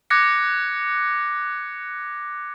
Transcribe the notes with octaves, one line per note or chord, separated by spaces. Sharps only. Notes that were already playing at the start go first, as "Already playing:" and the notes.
D6 F#6 G#6 A#6 C#7